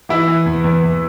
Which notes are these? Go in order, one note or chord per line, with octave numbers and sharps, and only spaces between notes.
E3 E4
E3
E2
E2
E2